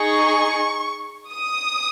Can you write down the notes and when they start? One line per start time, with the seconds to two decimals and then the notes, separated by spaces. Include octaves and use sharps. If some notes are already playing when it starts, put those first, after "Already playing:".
Already playing: D#4 G#4 C#6
1.32 D#6